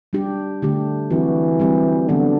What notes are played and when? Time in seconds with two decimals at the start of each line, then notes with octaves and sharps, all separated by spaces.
0.13 G3 D4 G4
0.62 D3 A3 D4 G4
1.11 E3 F#3 C4 F#4
1.60 G3 C4 G4
2.08 D3 F#3 B3 D4